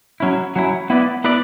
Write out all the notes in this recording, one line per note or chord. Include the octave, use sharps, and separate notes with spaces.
F#3 C#4 E4
F#3 C#4 E4
B3 E4 B4 D5
B3 E4 B4 D5